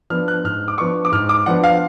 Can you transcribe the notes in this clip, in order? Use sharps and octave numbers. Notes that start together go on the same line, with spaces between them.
F3 B3 D4 F6
F#6
G#2 F6
D6
F3 B3 D4 C#6
D6
G#2 F6
D6
F3 B3 D4 F#5
F5